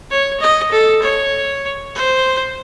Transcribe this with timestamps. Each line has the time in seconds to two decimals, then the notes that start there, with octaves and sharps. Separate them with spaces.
0.10 C#5
0.40 D#5
0.72 A4
1.02 C#5
1.95 C5